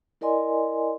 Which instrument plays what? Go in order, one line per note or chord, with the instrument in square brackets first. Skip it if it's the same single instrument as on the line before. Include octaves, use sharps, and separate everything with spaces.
[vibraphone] E4 A#4 D5 D#5 G#5 C6